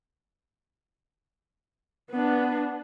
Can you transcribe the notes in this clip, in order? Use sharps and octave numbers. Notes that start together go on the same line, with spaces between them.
B3 D4